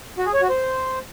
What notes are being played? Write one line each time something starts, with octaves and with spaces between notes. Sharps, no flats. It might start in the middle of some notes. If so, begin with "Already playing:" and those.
F#4
G#4
C#5
F#4
C5